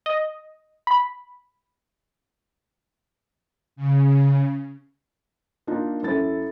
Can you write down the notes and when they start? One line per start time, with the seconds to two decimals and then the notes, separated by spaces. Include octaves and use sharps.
0.06 D#5
0.87 B5
3.76 C#3
5.67 A#3 D4 D#4 F4 A#4
6.03 F#2 E4 A4 A6